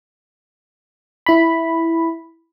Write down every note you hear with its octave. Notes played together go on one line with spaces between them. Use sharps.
E4 B5